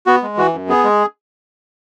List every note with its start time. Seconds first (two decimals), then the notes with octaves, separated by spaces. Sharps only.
0.06 B3 F#4
0.22 G#3
0.37 E3 F#4
0.53 F#2
0.69 B3 G#4
0.84 G#3